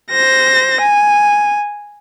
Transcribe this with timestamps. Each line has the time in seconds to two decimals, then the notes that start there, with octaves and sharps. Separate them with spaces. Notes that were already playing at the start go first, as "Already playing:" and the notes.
0.11 C5 A#6
0.81 G#5